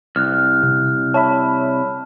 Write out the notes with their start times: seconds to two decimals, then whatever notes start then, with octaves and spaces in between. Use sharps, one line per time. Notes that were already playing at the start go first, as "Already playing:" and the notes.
0.16 C2 F6 F#6
0.63 C3
1.14 C#5 E5 A5 B5